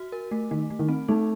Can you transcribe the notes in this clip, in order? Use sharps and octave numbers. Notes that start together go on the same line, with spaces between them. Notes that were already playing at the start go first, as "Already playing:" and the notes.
Already playing: F#4
A#4
A3
D#3 A3
A3
D#3
C4
A3 D#4